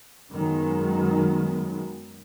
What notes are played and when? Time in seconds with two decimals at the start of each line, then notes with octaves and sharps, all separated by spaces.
0.32 F#2 D#3 F#3 G#3 B3